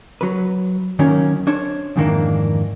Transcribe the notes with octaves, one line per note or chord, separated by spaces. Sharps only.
F#3 B4
D#3 F#3 A#3 C#4
D4 C5 C#5
F2 G#2 D#3 E3 A#3 D4